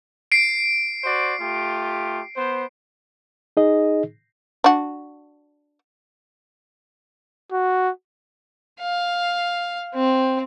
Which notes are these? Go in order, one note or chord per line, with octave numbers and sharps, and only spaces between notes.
C7 D7
F#4 C5 D5
A3 F4 G4
B3 C5
D#4 G#4 D#5
D4 F#4
F#4
F5
C4